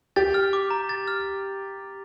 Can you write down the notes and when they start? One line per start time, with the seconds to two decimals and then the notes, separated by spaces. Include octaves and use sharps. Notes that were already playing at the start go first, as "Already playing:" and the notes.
0.16 G4 A6
0.34 F6
0.53 D6
0.71 A#5
0.89 A6
1.08 F6